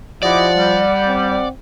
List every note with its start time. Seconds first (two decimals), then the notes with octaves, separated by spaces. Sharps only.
0.23 F3 E4 G4 D5 D#5 F#5
0.56 G3
1.06 C4